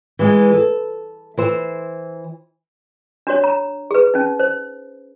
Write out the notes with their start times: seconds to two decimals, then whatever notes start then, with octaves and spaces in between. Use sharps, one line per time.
0.19 E3 G#3
0.54 A4
1.38 E3 C5 E5
3.27 D4 F#4 C#5
3.44 A#5
3.91 G#4 B4
4.14 C#4 D#4
4.40 C5